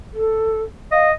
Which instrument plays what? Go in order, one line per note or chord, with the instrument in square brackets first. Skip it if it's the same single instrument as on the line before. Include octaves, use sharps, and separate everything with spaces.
[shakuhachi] A4
[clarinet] D#5 [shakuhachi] F5